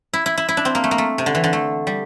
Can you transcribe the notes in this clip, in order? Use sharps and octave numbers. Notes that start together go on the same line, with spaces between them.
E4
E4
E4
E4
D4
C4
A#3
A3
A#3
A3
C3
D3
E3
D3
A3
G3